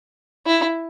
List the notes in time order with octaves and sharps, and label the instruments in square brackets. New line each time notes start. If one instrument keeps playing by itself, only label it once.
[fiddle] E4